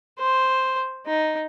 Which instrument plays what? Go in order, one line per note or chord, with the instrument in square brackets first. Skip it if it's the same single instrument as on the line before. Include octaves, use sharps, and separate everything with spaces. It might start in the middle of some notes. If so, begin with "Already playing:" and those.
[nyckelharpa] C5
D#4